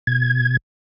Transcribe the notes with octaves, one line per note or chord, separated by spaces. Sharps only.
B2 G#6